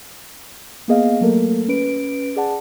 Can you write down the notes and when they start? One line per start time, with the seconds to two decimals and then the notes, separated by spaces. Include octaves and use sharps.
0.88 A#3 B3 G#4 D#5 F5
1.21 F#3 A3 A#3 A4 A#4
1.68 C#4 B4 D7
2.36 G#4 D5 F#5 A5